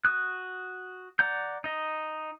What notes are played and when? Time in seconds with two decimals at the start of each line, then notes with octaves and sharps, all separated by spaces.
0.05 F#4 D#6 F#6
1.19 D5 F#5 A#5 G6
1.64 D#4 D#5